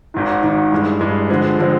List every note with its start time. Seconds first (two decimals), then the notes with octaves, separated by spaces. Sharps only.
0.14 G#1 G#2 D#3
0.43 G#1 G#2 D#3
0.72 G2 E3 G#3
1.00 G2 E3 G#3
1.30 D3 F3 G#3 C4
1.59 D3 F3 G#3 C4